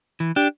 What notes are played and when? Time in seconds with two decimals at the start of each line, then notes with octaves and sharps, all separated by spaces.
0.20 E3
0.36 D4 G4